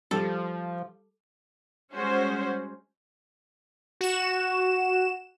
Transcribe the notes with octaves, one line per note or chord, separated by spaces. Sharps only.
F3 G3 A4
G3 G#3 C#4 F#4 C5
F#4 E7